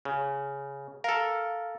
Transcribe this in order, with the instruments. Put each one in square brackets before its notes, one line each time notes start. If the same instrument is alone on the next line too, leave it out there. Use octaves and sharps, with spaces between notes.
[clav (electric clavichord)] C#3
[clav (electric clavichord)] A4 A#4 [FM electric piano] F5